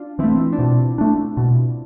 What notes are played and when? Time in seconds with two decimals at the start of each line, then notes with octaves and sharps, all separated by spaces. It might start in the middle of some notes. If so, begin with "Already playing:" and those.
Already playing: D4 F4
0.19 E3 A3 C4 E4
0.53 D4
0.58 B2 C4
0.98 A3 D4
1.37 B2